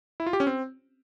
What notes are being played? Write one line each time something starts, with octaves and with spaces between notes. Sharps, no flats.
E4
F4
G4
C#4
C4